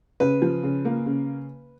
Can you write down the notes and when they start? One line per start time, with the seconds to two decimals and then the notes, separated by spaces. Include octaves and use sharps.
0.20 C#3 B4
0.42 F3
0.63 C#3
0.85 A#3
1.06 C#3